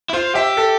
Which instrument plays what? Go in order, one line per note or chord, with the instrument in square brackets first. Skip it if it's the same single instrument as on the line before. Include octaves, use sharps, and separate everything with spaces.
[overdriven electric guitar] E4
[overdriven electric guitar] F4 [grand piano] C5
[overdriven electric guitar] G4 [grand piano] E5
[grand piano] A4